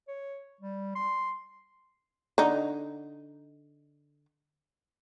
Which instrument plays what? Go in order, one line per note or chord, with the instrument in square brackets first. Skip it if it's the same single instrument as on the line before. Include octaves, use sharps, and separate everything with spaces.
[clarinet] C#5
G3
C6
[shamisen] D3 D#4